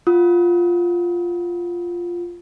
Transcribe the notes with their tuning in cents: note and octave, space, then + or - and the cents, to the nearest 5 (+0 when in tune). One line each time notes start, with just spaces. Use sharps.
F4 +0 F#5 +0 D#6 +35